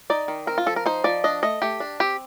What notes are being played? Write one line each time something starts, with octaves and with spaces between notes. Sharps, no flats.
D#4 D5
D#3
C4 A#4
F4
F3 A4
A#4
D#4 C5
F3 D5
D4 D#5
A3 D#5
A3 G4
D4
C4 G4